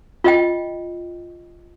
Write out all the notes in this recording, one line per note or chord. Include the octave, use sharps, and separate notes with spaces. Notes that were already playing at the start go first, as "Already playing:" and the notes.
F4 D#5 G5